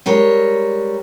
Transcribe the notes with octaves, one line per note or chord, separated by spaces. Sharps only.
G3 G#3 A#4 C#5